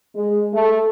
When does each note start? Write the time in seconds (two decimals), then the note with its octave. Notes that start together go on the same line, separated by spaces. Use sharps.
0.16 G#3
0.53 A3